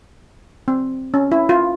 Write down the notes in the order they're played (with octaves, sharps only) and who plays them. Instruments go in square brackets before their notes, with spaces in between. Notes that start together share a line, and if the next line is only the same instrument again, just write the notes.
[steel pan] C4
C#4
E4
F4